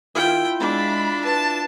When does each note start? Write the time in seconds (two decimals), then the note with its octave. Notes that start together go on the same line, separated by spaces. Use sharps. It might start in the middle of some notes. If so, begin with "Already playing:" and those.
0.15 D#3 E4 F4 G5
0.60 G#3 D4 B5
1.25 B4 A5